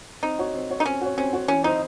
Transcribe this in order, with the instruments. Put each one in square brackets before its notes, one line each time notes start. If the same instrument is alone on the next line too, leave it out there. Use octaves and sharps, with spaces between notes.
[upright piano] C4 [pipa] D#4
[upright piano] F#4 C#5
C4
F#4 C#5
[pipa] D#4
[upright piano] C4 [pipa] C#4
[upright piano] F#4 C#5
[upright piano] C4 [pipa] C#4
[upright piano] F#4 C#5
[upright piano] E3 [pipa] C#4
[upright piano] C4 E4 C5 D#5 [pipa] D#4